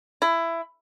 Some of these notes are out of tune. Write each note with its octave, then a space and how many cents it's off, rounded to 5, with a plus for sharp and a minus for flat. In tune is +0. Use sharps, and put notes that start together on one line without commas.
E4 +15